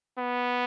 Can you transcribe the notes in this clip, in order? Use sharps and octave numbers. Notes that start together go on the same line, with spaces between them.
B3